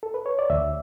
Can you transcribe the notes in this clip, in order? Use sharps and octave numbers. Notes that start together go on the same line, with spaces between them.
A4
B4
C#5
D5
D2 E5